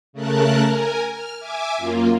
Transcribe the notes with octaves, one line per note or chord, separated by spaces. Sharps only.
C#3 A3 A#4 A5 F#6
A#4 G#5
F6
E5 G#5 D6
F#2 A#3 F4